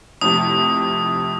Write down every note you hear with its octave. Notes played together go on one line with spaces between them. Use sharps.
F2 A2 C3 D#6